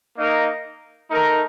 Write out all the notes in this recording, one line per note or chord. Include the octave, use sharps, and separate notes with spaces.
A#3 D#4 A#4 D#5
A3 D#4 A#4